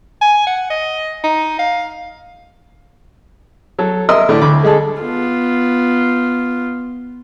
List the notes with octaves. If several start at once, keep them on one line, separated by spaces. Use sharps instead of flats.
G#5
F#5
D#5
D#4
F5
F#3 A4
A#4 D#5 E5 C6 D#6 E6
A2 D3 A3 D4
D2 B5 D6
D3 G#3 G#4 A4
B3 F4